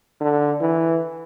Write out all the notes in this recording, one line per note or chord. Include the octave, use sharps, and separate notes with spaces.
D3
E3